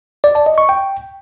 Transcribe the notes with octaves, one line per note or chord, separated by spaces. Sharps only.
D5
A5
D#5
C#6
G5